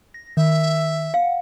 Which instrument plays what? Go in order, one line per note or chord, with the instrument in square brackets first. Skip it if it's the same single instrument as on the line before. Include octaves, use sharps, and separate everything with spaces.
[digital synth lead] A#6
[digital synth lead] D#3 [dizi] E5
[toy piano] F5 [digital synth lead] F#5